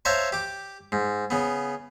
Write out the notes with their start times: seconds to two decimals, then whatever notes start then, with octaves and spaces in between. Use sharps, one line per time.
0.05 C5 C#5 E5 F5 A5 A#5
0.32 G4 D6
0.92 G#2
1.30 C#3 B3